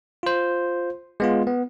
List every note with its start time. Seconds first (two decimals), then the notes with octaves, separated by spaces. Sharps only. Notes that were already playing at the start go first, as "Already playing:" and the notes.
0.23 F4 C5
1.20 G#3 B3 F4
1.47 B3